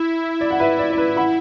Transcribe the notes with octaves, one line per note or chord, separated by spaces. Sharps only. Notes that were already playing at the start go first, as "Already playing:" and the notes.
Already playing: E4
D5
F#5
B4 E5
D5
D5
B4
F#5 B5